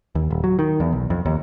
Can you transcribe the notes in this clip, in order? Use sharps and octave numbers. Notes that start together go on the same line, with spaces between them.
D#2
D#1
F#3
D#3
E2
B1
F2
D#2